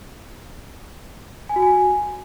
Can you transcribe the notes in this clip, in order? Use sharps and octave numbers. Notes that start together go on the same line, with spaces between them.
G#5
F#4
G#5